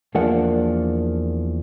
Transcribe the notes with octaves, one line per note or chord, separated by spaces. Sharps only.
E2 F3 A#3 D4 F#5